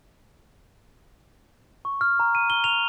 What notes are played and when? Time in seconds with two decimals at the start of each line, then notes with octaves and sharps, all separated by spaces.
1.85 C#6
2.01 F6
2.20 A#5
2.35 D#7
2.50 G7
2.64 F7